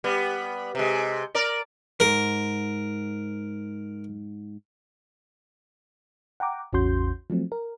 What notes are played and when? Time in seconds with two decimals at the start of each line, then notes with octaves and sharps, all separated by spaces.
0.04 G3 B3
0.75 C3 G#3
1.35 A#4 D5
2.00 G#2 A#4
6.40 F#5 G5 A#5 D6
6.73 A1 E2 C#4 F#4 C6 G6
7.30 F3 F#3 A3 C4
7.52 A#4